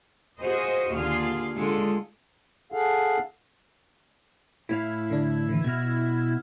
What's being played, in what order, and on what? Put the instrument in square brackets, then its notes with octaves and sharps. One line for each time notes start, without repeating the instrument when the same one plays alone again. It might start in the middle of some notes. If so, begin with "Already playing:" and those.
[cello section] F4 F#4 G#4 C5 D#5
D#2 D3 F4 G#4 F5
D3 G#3 F4 G#4 A4
[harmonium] G#4 A4 F5 F#5
[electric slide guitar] A2 C#5 F5 [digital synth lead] E4
[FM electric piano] D3 D4
D3 E3
[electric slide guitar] B2 F#4 [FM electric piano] F6 G#6